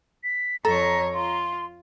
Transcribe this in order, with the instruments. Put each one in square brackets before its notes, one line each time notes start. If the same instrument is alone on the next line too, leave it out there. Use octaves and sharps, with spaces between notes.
[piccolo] B6
[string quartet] F2 C#5 [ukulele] A4 [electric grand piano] A#5 [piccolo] A#6
[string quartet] F4 [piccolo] C6